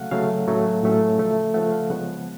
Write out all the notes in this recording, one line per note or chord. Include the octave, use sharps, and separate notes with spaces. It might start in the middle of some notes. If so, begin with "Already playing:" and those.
Already playing: C#3 F#3 A3 F5 F#5
C#3 F#3 A3 F5
A2 F#3 A3 C#4
A2 F#3 A3 C#4
C#3 F3 A3
C#3 F3 A3 F#5
F5
C#3 F3 G#3 B3 F#5